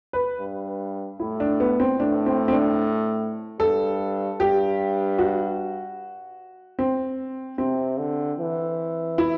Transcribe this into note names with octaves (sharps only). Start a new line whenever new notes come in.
B4
G2
A2 E4
D4
B3
C4
A2 D4
C4
C4
D4
G2 A4
G2 G4
F#4
C4
C3 C4
D3
E3
E4